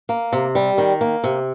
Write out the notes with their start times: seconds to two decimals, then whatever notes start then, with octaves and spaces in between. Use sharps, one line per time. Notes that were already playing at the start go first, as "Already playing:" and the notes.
0.09 A#3
0.33 C3
0.55 G3
0.78 D#3
1.01 A#3
1.24 C3